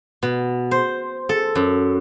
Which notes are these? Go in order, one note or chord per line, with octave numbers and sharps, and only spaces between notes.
B2
C5
A4
F#2